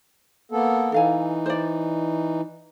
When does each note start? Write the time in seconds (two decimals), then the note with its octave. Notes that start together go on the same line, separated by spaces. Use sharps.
0.52 A#3 B3 A4
0.92 E3 D#4 A4 F5 G#5
1.46 C5 D5